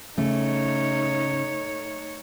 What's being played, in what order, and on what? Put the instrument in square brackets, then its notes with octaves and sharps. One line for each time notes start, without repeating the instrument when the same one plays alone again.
[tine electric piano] C#3 C#4 [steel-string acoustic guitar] A3 [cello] D#4 C#5